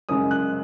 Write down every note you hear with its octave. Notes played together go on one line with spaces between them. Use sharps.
F#2 C#3 G#3 D#6
F#6